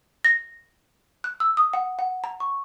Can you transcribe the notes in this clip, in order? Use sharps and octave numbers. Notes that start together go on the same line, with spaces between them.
A#6
F#6
E6
D#6
F#5
F#5
A#5
C#6